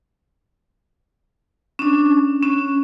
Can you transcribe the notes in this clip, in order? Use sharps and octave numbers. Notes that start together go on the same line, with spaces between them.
C#4 D4
C#4